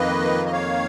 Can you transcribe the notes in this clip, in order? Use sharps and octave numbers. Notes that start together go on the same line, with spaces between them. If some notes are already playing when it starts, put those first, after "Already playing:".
Already playing: F2 D#3 A#3 B4 D#5
D#5
C#5 F5